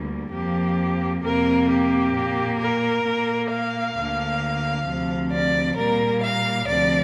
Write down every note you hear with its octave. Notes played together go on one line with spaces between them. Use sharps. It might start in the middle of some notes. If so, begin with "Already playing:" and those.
Already playing: D2 D3 G3 A#3
F2 F3 A#3 G4
F2 C3 A#3 A#4
G4
A#2 A#3
A#4
A#2 A#3
F5
D2 D3 A#3
D2 C3 F3
D5
A#2 G3 A#3 A#4
F5
D2 C3 F3 D5